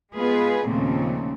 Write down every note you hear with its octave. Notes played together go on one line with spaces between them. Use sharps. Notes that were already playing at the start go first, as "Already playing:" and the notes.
G#3 B3 F4 G#4 B4
D#2 A#2 C#3 F3 A3 C4